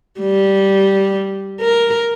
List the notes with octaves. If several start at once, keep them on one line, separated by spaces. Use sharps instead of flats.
G3
A#4